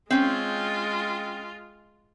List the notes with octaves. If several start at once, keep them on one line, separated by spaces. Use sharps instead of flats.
G#3 C4 C#4 F4